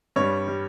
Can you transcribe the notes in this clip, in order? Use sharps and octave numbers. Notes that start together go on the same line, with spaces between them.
G2 G3 C#5
G3